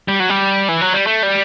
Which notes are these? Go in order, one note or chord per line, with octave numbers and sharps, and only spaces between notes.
G3
F#3
G3
E3
F#3
G3
A3
G3